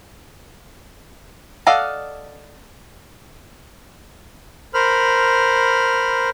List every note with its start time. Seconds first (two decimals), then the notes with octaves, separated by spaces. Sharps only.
1.67 A4 D5 D#5 F5 F#5
4.74 A#4 C5 B5 F6